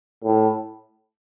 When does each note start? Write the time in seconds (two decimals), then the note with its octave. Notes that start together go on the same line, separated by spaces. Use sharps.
0.24 A2